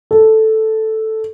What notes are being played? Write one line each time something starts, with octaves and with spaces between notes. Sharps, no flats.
A4